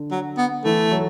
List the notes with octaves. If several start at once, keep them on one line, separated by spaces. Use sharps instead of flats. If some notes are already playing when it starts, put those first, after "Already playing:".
Already playing: D3 D4
F#3
B3
E3 A3 E4
F#3 F#4